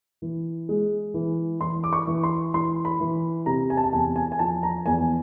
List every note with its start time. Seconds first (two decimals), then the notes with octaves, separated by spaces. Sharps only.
0.22 E3
0.69 G#3
1.14 E3
1.61 E3 C6
1.84 D6
1.93 C#6
2.07 E3
2.23 C6
2.54 E3 C6
2.85 B5
3.00 E3
3.46 C3 A#5
3.70 G#5
3.77 A5
3.83 G#5
3.93 E2 A5
4.16 G#5
4.32 G#5
4.39 F3 A5
4.63 A#5
4.86 E2 G#5